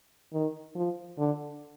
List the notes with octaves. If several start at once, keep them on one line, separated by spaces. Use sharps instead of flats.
D#3
F3
D3